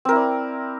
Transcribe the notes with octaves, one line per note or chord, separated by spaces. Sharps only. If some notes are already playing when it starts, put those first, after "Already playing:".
C4 E4 A#4 D5